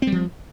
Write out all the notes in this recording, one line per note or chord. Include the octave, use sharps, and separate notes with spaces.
F3 G3 C4